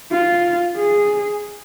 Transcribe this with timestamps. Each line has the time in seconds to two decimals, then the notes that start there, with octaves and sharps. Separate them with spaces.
0.12 F4
0.77 G#4